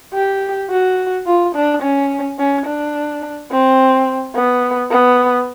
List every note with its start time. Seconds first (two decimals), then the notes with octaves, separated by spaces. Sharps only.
0.14 G4
0.70 F#4
1.26 F4
1.55 D4
1.82 C#4
2.39 C#4
2.66 D4
3.51 C4
4.35 B3
4.91 B3